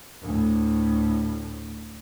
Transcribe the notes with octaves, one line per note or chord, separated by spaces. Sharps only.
D2 A2